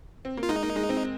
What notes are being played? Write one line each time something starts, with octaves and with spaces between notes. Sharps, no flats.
C4
A#3
F4
G#3 D#4
A#3
G#3
C4